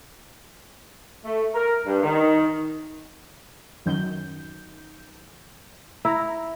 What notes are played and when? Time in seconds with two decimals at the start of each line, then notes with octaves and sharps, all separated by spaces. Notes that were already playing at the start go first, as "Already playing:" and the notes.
1.24 A3
1.54 A#4
1.86 G2
2.02 D#3
3.86 F#2 D#3 G6
6.05 E4 A#5